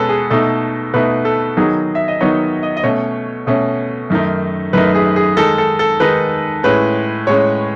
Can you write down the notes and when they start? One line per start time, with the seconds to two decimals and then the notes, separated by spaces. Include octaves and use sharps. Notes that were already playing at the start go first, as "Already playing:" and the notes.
Already playing: B2 G#3 C#4 A4 B4
0.09 G#4
0.30 B2 A3 D#4 A4
0.94 B2 A3 D#4 B4
1.25 A4
1.57 D#3 F#3 B3 D#4 G#4
1.95 E5
2.08 D#5
2.21 D#3 F#3 B3 D#4 C#5
2.63 D#5
2.77 D#5
2.83 B2 A3 C#4 C#5
3.47 B2 A3 C#4
4.10 F#2 D#3 A3 D#4
4.73 F#2 D#3 A3 D#4 B4
4.95 G#4
5.16 G#4
5.37 D#3 G#3 D#4 A4
5.58 A4
5.79 A4
6.00 D#3 G#3 D#4 B4
6.63 A2 G#3 C#4 B4
7.27 A2 G#3 C#4 C#5